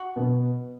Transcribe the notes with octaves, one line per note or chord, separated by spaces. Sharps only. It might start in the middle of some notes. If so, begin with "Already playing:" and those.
Already playing: F#4
B2 B3